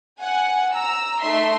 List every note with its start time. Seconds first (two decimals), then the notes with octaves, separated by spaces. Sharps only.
0.20 F#5 G#5
0.74 A#5 E6
1.22 A3 D#4 E5 C6